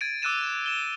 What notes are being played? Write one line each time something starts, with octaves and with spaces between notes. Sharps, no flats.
G#6 A6 D7 D#7
D6 E6 F#6 A6 D#7 E7
E7
E7 G7